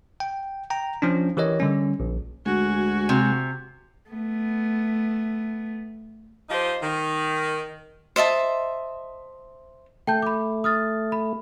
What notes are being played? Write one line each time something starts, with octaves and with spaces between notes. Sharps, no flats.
G5
G5 A#5
F3 C#4 D4
E3 G4 A#4 C#5 D#5
D3 G3 C#4
A#1
D2 G#3 F#4 G#5
C3
A3 B3
F3 D#4 G4 C5 D#5
D#3
C5 D#5 E5 A5
A3 G5 A5 G6
B5 D6
D#6 F6 A6
B5